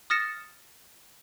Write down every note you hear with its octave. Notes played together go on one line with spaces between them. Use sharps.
D#6 F6 A6 A#6 C#7 E7